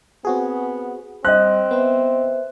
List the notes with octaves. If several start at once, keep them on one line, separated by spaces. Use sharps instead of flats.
B3 C4 F#4 G#4
G3 C4 C5 D#5 F#6
B3 C5 E5